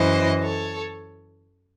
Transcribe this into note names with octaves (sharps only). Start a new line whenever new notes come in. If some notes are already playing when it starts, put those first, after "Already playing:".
Already playing: F#2 E3 C5 D#5
A4 C#5